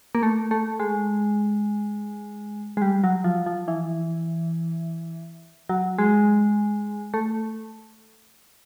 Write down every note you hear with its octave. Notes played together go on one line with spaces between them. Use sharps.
A#3
A3
A3
G#3
G#3
G3
F#3
F3
F3
E3
F#3
G#3
A3